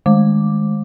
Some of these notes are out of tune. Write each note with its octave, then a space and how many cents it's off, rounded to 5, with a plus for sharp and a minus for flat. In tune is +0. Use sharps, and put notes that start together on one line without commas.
D#3 +0 G#3 +0 D6 +0